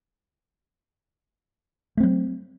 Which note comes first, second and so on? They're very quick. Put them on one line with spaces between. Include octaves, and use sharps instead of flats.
A3 C4 F#3